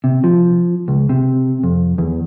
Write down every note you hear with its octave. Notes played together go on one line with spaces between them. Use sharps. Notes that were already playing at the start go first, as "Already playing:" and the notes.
C3
F3
C#2
C3
F2
E2